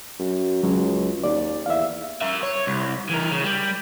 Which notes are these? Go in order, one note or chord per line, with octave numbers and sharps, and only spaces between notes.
F#2
C#2 F#3 C#4
D#2 D5
E2 E5 F5
A#4 E5
C#5
C2
E3 A#4
C#3
G3